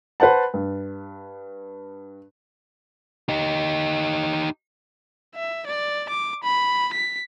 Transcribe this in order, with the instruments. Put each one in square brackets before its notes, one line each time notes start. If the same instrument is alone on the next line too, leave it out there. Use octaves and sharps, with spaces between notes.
[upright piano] B4 C5 F#5 A5
G2
[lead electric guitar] D#4 G4
[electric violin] E5
D5
D6
B5
B6